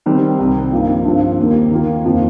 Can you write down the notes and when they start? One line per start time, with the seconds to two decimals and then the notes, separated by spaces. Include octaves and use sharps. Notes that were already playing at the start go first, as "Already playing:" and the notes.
0.06 D#3 G3 C4 D#4
0.39 C2 C3 D#3
0.72 G2 F3 A#3 D#4
1.05 G2 F3 C4 F4
1.39 D#2 D#3 A#3 G4
1.71 D#3 A#3 F4
2.05 F2 F3 A#3